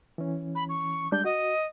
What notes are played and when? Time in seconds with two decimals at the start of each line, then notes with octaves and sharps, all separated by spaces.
0.18 E3 C#4
0.55 B5
0.69 C#6
1.12 G3 G#3 D4 G6
1.25 F#4 D#5